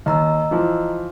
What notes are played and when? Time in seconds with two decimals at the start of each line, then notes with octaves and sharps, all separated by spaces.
0.06 D#2 D#5 A#5 E6
0.51 E3 F3